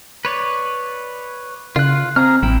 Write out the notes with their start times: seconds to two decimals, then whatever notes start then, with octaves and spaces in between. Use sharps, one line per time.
0.25 B4 C#5 D5
1.76 C#3 F4 F#6
2.16 C4 G#4 A#5 F6
2.43 A1 E4 G5